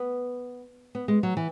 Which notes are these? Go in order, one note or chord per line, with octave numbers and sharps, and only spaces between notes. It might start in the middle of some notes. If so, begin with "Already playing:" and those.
Already playing: B3
B3
G#3
F#3
E3